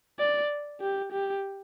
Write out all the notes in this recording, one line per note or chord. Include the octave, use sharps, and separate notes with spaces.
D5
G4
G4